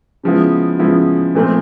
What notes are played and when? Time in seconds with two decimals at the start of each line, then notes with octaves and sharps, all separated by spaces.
0.23 C#3 F3 G#3 B3 E4
0.79 C#3 F3 G#3 B3 E4
1.35 A#2 F3 A3 C4